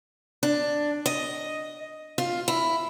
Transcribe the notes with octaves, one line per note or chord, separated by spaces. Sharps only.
D4
D#5
F4
E4